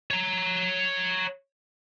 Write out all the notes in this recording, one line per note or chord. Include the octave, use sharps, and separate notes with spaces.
C#5 A#5